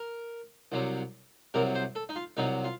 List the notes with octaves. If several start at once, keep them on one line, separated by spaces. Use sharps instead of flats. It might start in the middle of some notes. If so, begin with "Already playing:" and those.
Already playing: A#4
C2 C3 F#3
C2 C3 F#3 A#4
C5
A4
D#4
F4
C2 C3 F#3 D#4
F4